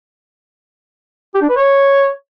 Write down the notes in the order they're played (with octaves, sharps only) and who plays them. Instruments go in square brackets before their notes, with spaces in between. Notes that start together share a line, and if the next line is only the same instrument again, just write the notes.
[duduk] G4
D4
B4
C#5